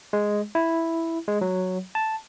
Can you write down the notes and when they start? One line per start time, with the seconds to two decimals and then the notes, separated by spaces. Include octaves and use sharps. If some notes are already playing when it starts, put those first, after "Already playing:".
0.13 G#3
0.55 E4
1.28 G#3
1.41 F#3
1.95 A5